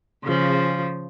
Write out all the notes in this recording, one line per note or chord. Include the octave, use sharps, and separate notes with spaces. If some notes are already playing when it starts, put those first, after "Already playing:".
C#3 F3